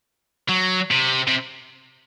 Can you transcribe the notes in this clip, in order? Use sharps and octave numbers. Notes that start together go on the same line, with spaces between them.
F#3
C3
C3